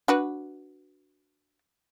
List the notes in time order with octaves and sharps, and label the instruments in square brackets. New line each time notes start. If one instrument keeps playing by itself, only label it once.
[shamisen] D4 F#4 B4